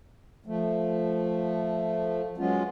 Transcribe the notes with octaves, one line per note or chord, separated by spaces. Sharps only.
F3 A3
F#3 G#3 B3 C#4 F4